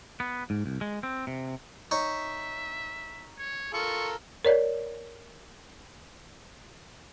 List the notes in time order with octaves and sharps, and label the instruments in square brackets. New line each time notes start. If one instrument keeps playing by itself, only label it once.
[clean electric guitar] B3
G#2
C2
G#3
C4
C3
[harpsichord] D#4 C#5 [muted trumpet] E5
[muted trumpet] C#5
[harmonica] F4 A4 A#4 [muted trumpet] C#6
[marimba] A#4 C#5 D5